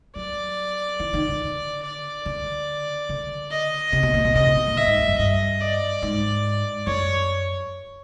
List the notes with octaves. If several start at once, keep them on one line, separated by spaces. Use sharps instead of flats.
F#3 D5
E3
D#3
D3
D5
D3
D3
D#5
C3
B2
A#2
B2
C3 D#5
C3
B2
A#2
A2 E5
G#2
F2
F#2
G2 D#5
D5
G#2
F#2 C#5